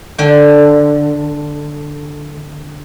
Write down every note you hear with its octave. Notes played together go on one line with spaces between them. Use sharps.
D3 G5